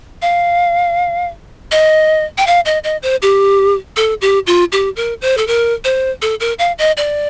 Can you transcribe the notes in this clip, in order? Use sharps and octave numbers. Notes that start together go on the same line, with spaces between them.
F5
D#5
G5
F5
D#5
D#5
C5
G4
A4
G4
F4
G4
A#4
C5
A4
A#4
C5
A4
A#4
F5
D#5
D5